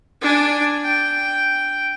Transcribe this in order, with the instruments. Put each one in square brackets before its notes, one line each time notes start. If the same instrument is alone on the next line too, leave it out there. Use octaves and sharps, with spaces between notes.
[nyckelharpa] D4 G#5
G5